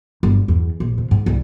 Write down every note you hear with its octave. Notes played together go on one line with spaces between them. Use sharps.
G1
E2
A#1
C3
G#2
C2